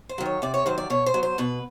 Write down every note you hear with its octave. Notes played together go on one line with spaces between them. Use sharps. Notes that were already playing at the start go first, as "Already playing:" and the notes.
C5
D#3 F#3
C#5
C3 D5
C#5
D#3 F#3 C5
D5
B2 C#5
C5
F#3
C5
B2 B4